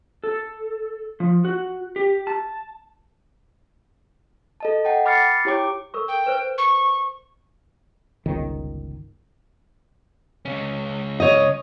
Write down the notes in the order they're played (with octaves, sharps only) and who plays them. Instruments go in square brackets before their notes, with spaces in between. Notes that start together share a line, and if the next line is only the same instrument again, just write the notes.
[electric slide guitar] A4
F3
F#4
G4
A5
[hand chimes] A4 D#5 A5
F#5 G5 A5
B5 D6 F6 A6 C7 C#7
E4 G4 C#5 G5 D6
[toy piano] A4 A#4 C#6
[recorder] G5
[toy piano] B4 C5
[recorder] C#6
[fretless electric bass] G1 C#2 D#3
[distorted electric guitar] C#2 C#4
[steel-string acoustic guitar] C#5 D#5